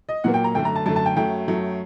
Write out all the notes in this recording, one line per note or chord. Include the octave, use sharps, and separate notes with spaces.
D#5
A#2 F#3 A#3 F#5
G5
A#5
F#2 D3 A3 G5
A#5
A5
F#2 D3 A3 A5
A5
G5
F#2 F#3 A3 G5
F#2 F#3 A3